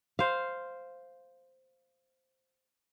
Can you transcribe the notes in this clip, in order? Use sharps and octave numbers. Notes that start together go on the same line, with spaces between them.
C5 F5